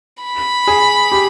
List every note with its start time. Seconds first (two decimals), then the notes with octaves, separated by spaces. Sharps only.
0.24 B5
0.67 G#4
1.12 G4